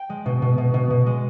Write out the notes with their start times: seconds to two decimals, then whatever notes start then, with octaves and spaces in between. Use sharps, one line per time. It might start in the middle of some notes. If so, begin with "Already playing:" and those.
Already playing: G5
0.10 G#3
0.26 B2
0.42 B2
0.58 B2
0.74 B2
0.90 B2
1.06 G#3